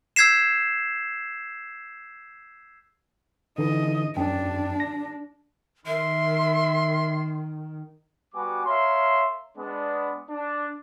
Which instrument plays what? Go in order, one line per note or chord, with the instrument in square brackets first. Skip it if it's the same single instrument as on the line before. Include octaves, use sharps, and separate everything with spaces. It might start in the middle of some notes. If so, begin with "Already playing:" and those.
[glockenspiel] E6 G6 G#6 B6 C7 E7
[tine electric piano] D3 E3 D#4 [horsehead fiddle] D#5
[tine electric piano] F#2 G5 [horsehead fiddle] D4
[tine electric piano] A#6
[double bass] D#3 [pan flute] A#4 [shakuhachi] E5 [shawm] C6
[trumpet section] G3 B3 F#4 B4 G#5 D6
A#4 C#5 E5 F5 C6
G#3 B3 D4
D4